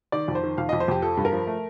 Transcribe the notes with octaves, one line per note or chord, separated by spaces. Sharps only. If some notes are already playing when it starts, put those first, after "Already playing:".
D#3 D5
F2
C5
D#3
F2 F5
F2 D#5
C5
F2 G4
F3 A4
G2
A#4
F3
A3